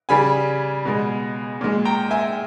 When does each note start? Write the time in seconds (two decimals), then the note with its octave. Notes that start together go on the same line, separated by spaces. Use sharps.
0.09 C#3 G3 G#5 B5
0.85 B2 G#3
1.61 A#2 G#3
1.85 G5 A#5
2.10 E5 G#5